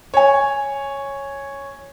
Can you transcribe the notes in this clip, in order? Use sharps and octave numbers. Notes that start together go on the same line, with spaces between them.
C#5 G#5